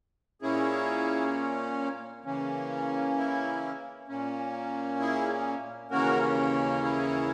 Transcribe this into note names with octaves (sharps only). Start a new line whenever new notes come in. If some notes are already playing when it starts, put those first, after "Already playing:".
A#2 A#3 C#4 E4 G#4
C#3 E3 A#3 C#4
E4
A#2 A#3 C#4
E4 G#4
D#2 C#3 E3 A#3 C#4 F#4 A#4
E4 G#4